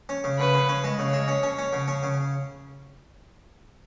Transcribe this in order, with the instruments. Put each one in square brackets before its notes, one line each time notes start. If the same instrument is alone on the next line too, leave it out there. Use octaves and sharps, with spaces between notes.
[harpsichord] C#4
C#3
[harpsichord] C#3 [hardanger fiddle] B4
[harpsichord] C#3
C#4
G#3
[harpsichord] C#3 [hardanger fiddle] C#5
[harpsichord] G#3
C#4
C#4
C#4
C#3
C#4
C#3